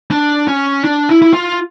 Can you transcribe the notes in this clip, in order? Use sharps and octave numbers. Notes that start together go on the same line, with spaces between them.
D4
C#4
D4
E4
E4
F4